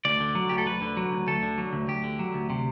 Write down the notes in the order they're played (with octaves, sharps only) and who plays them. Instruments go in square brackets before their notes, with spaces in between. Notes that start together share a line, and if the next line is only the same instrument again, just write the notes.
[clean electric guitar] D2 D5
D3
F#3
D2 G4
A4
D2 B4
D3
F#3
D2
D2 A4
D3
F#3
D2
D2 G4
D3
F#3
D2
C3